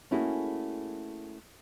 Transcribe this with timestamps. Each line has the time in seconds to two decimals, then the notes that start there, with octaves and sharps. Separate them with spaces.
0.11 A3 A#3 C#4 E4 F#4 G#4